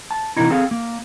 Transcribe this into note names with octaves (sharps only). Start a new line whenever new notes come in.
A5
C3 D#3 E3 A#3 D#4 E4
C4 G#4 A4 F5
A#3